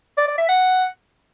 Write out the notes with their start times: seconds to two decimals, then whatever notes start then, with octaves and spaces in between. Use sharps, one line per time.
0.17 D5
0.28 D5
0.38 E5
0.48 F#5